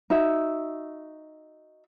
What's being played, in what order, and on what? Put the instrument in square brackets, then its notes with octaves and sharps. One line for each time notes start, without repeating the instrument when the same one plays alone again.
[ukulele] D#4 F#4 E5